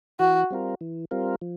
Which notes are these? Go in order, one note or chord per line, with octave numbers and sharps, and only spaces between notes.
E3 F#4
G3 C4 F4 A#4
E3
G3 C4 F4 A#4
F3